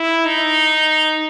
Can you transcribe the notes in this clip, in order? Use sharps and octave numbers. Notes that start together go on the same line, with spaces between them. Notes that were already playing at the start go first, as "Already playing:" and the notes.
Already playing: E4
D#4